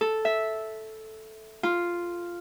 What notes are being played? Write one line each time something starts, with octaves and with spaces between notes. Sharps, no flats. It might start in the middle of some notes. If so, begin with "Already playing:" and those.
A4
E5
F4